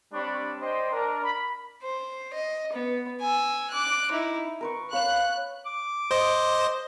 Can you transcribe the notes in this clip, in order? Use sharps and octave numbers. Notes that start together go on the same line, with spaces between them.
G3 C4 D4 C#5 B5 C#6
C5 D5 D#5 G5 C6
D4 A#4
B5
C5
D#5
B3
G#5 E6
D6 F#6
D#4 E4
A#4 B4 C#6
B4 C#5 F5 F#6
D6
C5 D#5